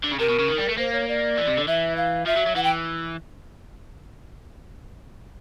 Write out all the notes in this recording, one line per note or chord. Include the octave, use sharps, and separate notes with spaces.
D3
C#3
C3 A#4
B2
C#3
D#3
G3
A3
A#3 C5
C#5
D5
E3
C3
D3
E3 E5
F5
F3 E5
F#3
F#3
E3 F#5
G5